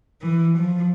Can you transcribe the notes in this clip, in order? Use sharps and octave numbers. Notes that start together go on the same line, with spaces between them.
E3
F3